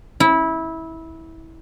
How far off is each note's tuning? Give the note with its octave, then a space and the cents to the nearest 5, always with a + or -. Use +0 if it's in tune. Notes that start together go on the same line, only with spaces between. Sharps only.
E4 -20